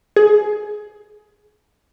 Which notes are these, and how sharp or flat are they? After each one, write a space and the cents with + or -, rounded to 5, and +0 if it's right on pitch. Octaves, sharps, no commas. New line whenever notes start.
G#4 +20